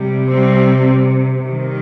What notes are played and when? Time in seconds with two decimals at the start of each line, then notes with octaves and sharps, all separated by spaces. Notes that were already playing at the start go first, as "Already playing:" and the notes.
Already playing: C3 G3
0.30 G3 C4
1.46 C3 D#3 G3